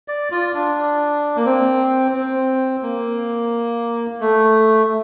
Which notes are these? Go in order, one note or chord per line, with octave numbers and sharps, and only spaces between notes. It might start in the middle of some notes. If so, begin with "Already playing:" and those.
D5
F4
D4
A#3
C4
C4
A#3
A3